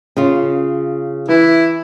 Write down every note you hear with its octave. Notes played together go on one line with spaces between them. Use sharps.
C#3 F4
E3 E4